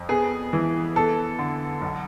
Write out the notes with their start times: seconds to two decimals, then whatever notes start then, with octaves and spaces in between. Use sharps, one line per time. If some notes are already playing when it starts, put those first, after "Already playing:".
Already playing: F2
0.09 B3 G#4
0.53 E3
0.96 B3 A4
1.39 D3
1.82 B1